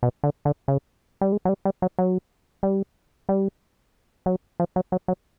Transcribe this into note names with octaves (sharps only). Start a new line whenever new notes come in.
B2
D3
D3
C#3
G3
G#3
F#3
G3
G3
F#3
F#3
G3
G3
F#3
F3
F#3
F#3
F#3